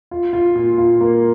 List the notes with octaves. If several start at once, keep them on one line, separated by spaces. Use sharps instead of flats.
F4
F4
A#2
F4
A#3